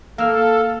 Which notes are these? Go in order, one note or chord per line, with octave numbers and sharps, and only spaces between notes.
A#3 A4 F5 E6 F6